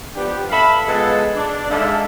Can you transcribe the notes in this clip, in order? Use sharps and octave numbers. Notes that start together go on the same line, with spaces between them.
F3 B3 D4 G4
A4 E5 F5 B5
G#3 B3 F4 A4 D#5
D4
D3 G#3 D#4 A4 E5 F5